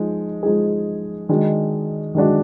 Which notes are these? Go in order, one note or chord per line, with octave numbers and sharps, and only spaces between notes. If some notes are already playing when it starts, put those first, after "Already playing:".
Already playing: F3 G#3 D#4
F3 G#3 D#4 G#4
D#3 G#3 D4 F#4
D#3 G#3 D4 F#4